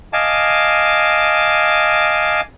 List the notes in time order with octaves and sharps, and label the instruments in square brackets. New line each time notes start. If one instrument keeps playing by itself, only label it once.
[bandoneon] D#5 F5 G#5 A5 D6